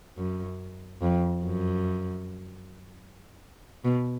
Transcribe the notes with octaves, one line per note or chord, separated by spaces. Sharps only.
F#2
F2
F#2
B2